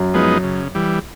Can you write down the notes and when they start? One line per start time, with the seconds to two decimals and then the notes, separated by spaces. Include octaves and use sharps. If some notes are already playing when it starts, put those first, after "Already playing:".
Already playing: F#2
0.14 F3 G#3 B3 D#4
0.43 C#3
0.75 E3 G3